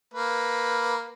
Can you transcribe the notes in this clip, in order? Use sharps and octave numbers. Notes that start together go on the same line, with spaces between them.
A#3 B4